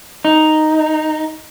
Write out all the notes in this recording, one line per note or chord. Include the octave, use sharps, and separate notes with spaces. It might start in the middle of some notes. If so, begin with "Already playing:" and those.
D#4